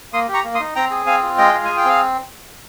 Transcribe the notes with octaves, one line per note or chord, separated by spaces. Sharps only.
A#3 C6 D#6
G4
A#5 C#6
A#3
C6 D#6
D#4
C4 G5 A#5
G#4
C4 F5 G#5
F4
G#3 D#5 G5
F4
G#4 G#5
G5
C4 F5